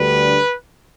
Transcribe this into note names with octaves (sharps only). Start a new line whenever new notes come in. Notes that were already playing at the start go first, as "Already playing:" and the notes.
Already playing: D2 D3 G3 B4